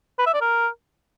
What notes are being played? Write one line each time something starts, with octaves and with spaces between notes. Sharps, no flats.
B4
E5
D5
A#4